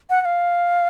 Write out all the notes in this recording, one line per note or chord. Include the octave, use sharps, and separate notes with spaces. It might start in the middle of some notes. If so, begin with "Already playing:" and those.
F#5
F#5
F5